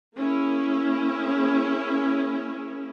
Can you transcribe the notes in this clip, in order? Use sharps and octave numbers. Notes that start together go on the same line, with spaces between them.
A#3 C#4 E4 G#4